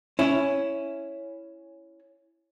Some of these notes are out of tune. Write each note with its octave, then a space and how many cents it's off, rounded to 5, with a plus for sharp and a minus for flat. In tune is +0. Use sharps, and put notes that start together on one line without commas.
C#4 +0 E4 +5